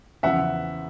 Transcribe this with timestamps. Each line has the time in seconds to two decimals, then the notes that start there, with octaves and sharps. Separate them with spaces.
0.23 E2 C#3 F3 E5 F#5